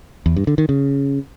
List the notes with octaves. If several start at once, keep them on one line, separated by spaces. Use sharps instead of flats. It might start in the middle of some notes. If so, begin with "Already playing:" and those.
E2
G2
D3
D#3
C#3